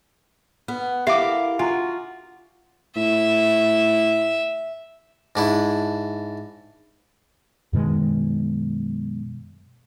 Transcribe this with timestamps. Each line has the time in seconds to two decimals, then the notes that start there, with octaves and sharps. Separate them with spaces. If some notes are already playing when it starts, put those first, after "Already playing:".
0.68 B3 B4
1.07 E4 G4 A4 A#4 E5 F5 D6
1.59 F4 F#4 G#5 A#5
2.96 A2 E5
5.36 G#2 D4 E4
7.73 F#2 B2 D#3 G#3